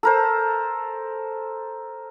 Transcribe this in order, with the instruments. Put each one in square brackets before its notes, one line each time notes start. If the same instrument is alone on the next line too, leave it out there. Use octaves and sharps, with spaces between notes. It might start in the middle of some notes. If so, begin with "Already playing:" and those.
[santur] A4 A#4 C5